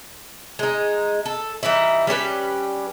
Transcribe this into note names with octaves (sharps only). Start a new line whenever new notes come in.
G#3 D#4
A4
E3 G3 D#4 E4
G3 C#4 G4 B4